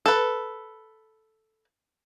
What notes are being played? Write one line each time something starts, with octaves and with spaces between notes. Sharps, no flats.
A4 B4